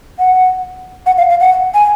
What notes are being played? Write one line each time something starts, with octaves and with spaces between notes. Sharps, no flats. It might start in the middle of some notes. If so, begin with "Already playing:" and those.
F#5
F#5
F5
F5
F#5
G#5